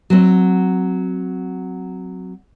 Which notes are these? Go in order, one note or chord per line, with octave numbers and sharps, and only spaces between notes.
F#3 C4